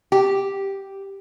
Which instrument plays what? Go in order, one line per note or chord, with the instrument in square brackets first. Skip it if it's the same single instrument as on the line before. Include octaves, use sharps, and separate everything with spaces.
[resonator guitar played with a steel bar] G4